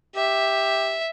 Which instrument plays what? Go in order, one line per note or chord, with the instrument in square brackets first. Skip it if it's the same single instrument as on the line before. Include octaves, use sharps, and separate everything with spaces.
[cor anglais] G4 [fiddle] E5